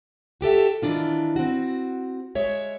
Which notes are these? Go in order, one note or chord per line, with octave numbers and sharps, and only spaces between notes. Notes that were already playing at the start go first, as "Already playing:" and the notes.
F#4 G4 A4 E5
D#3 E3 D4 F4
C4 F#4
G#3 C#5 E5